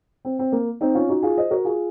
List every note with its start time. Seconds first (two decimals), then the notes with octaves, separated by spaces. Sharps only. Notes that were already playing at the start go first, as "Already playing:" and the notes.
0.25 C4
0.39 C4
0.52 A#3
0.81 C4 D#4
0.95 C#4 F4
1.09 D#4 F#4
1.23 F4 G#4
1.37 C5 D#5
1.51 F#4 A#4
1.65 F4 G#4